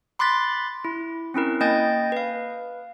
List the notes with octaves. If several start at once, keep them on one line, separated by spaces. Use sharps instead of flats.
B5 C6 D6 F#6 A6 B6
E4
C4 C#4 E4 A#4
A#3 D#5 G5 G#5 G6 A6
B4 F5